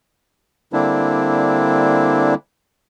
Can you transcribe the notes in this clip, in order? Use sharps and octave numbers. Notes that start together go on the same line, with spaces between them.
D3 G3 A#3 C4 D4 E4